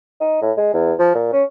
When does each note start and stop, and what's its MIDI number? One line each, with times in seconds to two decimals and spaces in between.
0.21 0.40 63
0.42 0.52 45
0.57 0.71 56
0.74 0.93 40
0.99 1.11 53
1.15 1.28 46
1.33 1.43 61